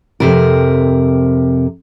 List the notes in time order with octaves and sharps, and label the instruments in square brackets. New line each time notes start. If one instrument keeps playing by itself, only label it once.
[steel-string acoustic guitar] F2 C3 A#4